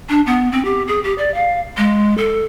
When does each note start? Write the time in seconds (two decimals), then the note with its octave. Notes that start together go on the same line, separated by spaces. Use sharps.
0.09 D4
0.26 B3
0.52 C4
0.65 G4
0.88 G#4
1.04 G4
1.18 D5
1.34 F5
1.77 G#3
2.18 A4